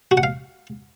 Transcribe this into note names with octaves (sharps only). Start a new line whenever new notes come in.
F#4
F#5
F5